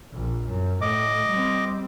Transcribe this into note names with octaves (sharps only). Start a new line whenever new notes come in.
A#1
F#2
A2 D#5 D6
G3 C4